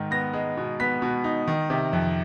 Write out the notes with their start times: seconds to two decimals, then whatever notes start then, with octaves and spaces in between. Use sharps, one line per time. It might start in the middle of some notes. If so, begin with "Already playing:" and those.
Already playing: G#2 D#3
0.11 B3 A#6
0.33 G#3
0.57 B2
0.80 B3 B6
1.02 B2
1.24 D#4
1.47 D#3
1.70 C3
1.93 F2